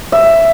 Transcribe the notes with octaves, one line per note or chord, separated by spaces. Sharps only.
E5